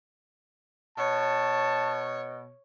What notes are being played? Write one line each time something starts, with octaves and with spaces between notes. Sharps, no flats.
B2 C#5 A5